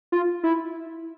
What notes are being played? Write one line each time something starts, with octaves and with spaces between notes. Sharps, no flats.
F4
E4